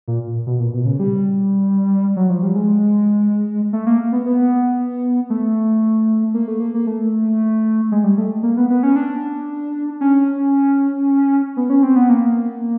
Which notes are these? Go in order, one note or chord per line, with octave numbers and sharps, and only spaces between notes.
A#2
B2
A#2
B2
C#3
G3
F#3
F3
G3
G#3
A3
A#3
B3
B3
A3
A#3
A3
A#3
A#3
A3
G#3
G3
A3
A#3
B3
B3
C#4
D4
C#4
B3
C#4
C4
B3
A#3